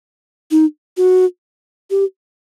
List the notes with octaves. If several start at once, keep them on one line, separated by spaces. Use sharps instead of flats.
D#4
F#4
G4